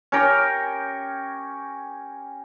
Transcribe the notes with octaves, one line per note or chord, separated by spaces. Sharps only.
C#4 G4 A#4 G5